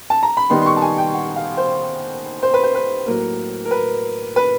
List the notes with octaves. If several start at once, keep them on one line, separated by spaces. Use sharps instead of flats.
A5
A#5
B5
D#3 G3 B3 D#4 C6
C6
C#6
A5
G#5
G5
F#5
F5
C5
C5
B4
C5
B4
A2 F#3 A#3 A#4
A#4
B4
B4